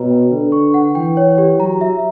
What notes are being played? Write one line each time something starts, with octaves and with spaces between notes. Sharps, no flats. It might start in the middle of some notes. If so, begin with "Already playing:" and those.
Already playing: B2 C#5 A#5
G5
D3 B4
C#6
F#5
E3 G5
C#5
G4
F#3 A#5
E5